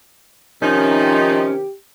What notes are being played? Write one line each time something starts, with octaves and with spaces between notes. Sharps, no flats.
C3 D#3 F3 C#4 D#4 G4